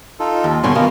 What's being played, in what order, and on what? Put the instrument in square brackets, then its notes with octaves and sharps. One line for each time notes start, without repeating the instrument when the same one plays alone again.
[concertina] D#4 F4 A4
[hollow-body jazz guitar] D#2
[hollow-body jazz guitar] G2 B2 D3 [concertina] G#5 C6 C#6
[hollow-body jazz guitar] B2 [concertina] A#3 F4 A#4